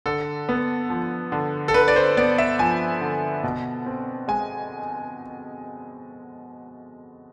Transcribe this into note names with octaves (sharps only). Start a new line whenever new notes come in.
D3 A4
B3
F3
D3
A4
D3 B4
D5
C5
B3 D5
E5
F3 G#5
D3
B2
C4
G#3 G#5